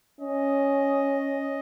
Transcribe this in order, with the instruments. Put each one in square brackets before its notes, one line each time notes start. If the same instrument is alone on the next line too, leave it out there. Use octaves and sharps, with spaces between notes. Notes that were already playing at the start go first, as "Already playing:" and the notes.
[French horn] C#4 [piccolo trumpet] D#5